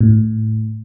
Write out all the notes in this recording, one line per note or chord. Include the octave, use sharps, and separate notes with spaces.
A2